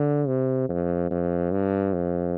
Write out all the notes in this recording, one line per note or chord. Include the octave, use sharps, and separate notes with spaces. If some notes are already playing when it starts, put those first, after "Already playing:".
Already playing: D3
C3
F2
F2
G2
F2